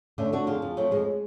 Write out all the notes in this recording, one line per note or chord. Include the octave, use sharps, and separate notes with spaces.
D3 A3 C#4
D3 D4 F#4
F2 F4 G#4
F2
F2 F#3 A3
F2 G#3